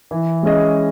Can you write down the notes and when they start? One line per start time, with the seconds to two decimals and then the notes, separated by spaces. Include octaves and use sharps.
0.11 E3
0.43 G#3 C#4 G#4 D#5